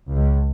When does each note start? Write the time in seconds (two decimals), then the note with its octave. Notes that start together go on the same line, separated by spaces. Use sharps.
0.12 C#2